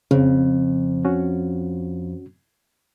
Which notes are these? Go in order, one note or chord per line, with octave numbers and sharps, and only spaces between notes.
F2 C#3
C#4 F#4